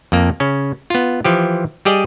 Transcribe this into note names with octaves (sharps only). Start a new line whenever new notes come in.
F2 A#3
C#3 C#4
B3 F4
E3 F3 G4
G3 G4 G#4 D5 D#5